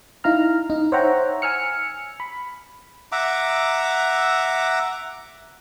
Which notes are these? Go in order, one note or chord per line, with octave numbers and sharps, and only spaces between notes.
D#4 E4 F5 A#5 F6
D#4
C5 C#5 E5 F#5 G5 A#5
G#5 E6 F6 C#7
B5
E5 F#5 A#5 D6